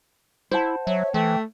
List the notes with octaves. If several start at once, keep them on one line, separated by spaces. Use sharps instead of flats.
E4 C5 F#5 A5
F#3 C#5 E5
E3 A3 G5